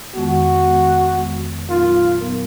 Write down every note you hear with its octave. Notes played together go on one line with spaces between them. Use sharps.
F2 D#3 G#3 B3 F#4
F2 D#3 G#3 B3
F2 D#3 G#3 B3
A#2 F#3 B3 D#4 F4 A#4
A#2 F#3 B3 D#4 A#4